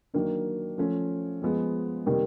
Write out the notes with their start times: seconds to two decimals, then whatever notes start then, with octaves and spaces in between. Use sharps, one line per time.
0.14 D#3 F#3 A#3 D4
0.78 F3 A3 C#4
1.42 F3 G#3 B3
2.06 C3 D#3 G3 A#3